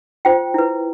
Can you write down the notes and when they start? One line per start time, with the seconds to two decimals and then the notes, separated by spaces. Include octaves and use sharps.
0.25 F4 C5 G5
0.54 E4 B4